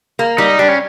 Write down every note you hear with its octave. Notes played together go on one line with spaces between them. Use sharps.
A#3
G3 D#4
G3 D4
C#4